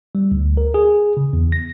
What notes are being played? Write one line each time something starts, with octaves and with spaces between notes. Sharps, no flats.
G3
D2
A#4
G#4
C#3
E2
A#6